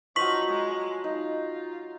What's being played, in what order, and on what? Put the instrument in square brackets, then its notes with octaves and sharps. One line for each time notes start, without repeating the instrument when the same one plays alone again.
[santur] F3 F#3 [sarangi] D#4 [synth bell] C#6 B6 F#7
[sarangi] G#3 [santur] A#5
[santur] D#4 [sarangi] F4